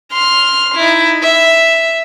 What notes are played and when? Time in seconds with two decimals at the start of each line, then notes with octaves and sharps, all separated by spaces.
0.12 C6 F6
0.75 D#4 E4
1.22 E5